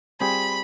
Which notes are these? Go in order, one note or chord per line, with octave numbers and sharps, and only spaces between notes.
G3 C4 F4 G#4 C5 B5